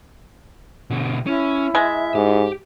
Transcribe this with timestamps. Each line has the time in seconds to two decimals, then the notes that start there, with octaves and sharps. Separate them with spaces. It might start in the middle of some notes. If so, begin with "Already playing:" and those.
0.90 B2 D3
1.26 C#4 E4
1.75 G#3 E5
2.15 G#2 G4